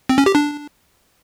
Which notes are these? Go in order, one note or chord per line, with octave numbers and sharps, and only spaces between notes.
C4
C#4
G4
D4